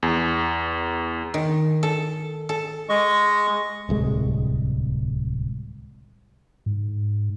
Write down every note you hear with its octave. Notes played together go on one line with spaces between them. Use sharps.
E2
D#3
A4
A4
G#3 D#5 C#6
D1 C2 G#3
G#2